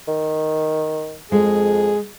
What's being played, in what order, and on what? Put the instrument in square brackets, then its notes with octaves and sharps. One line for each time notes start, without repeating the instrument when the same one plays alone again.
[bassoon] D#3
[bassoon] F2 [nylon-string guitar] G#3 [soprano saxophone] G#4